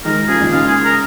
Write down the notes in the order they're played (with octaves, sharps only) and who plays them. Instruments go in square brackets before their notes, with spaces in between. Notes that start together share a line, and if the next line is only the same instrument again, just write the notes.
[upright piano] D#3 G#3 [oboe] A#4
[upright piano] C#3 F3 [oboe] G#4
[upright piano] A#2 D#3
[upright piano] G#2 C#3 [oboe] F4
[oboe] G#4
A#4